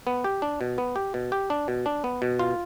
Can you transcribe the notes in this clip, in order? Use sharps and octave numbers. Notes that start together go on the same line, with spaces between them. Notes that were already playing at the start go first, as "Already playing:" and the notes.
B3
G4
D4
B2
B3
G4
B2
G4
D4
B2
D4
B3
B2
F4